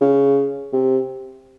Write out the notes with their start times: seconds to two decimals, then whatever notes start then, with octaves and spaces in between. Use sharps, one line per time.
0.01 C#3
0.73 C3